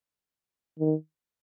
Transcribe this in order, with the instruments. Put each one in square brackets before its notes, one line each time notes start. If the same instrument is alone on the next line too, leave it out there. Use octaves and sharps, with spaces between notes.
[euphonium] D#3